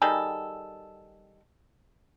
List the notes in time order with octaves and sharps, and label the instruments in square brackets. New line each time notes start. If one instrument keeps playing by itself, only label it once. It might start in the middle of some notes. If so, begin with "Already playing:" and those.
[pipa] D#3 G3 G#4 A4